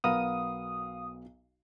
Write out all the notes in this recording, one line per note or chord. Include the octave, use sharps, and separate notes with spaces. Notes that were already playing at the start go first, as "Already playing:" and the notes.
B1 F#3 B3 F#4 A#4 F5 D#6